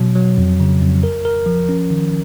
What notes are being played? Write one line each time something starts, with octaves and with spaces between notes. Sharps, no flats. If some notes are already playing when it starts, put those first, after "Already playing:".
Already playing: B2 F#3
F#3
F2
C#3
F2
A#4
A#4
F3
C#4
D#3